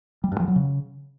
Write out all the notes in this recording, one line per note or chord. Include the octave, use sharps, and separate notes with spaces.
G3
G2
F3
F#3
C#3